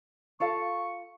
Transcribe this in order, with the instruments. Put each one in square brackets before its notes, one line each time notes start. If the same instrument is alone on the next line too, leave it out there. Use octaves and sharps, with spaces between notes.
[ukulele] F4 A4 F5 [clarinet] C#6